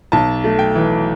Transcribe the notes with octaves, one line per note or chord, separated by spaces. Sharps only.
B1 A5
A3
G5
E3